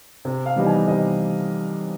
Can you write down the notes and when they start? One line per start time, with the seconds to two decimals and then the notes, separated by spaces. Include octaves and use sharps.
0.25 C3
0.46 F5
0.56 E3 G3 B3 D#4
0.66 G#5
0.87 C3 D#5